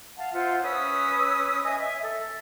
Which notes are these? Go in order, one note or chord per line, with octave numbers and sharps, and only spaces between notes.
F5 F#5 A5
F4 C5 E5 F#5
C#4 B4 D#6 E6
D#5 E5 G#5 D#6
E5
A4